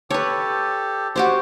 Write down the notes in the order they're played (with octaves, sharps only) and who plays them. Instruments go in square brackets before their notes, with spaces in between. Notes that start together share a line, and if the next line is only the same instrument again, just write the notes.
[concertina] G4 A4 [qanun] B4 C#5
[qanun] F#4 G4 C5 [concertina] C#5